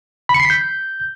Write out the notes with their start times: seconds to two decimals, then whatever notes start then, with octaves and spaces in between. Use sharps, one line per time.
0.29 B5
0.34 C#7
0.40 C7
0.45 B6
0.50 G6